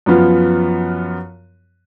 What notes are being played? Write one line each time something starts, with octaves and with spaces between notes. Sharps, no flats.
F#2 F3 B3 F4